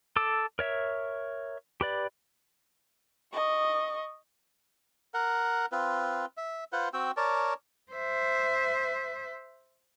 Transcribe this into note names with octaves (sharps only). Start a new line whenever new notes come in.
A4 D6 E6
A#4 C#5 E5
G4 B4 D5
D#5 C#6
A#4 F#5
C4 F4 B4
E5
F4 B4 C5 F#5
C4 F#4 G5 E6
A#4 C#5 D5 A5
C5 E5